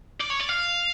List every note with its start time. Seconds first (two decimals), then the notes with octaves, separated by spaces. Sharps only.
0.20 D5
0.30 C#5
0.40 D5
0.49 F5